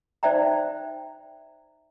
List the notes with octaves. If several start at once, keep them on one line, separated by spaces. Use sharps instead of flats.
D#4 C5 D5 E5 G5 A#5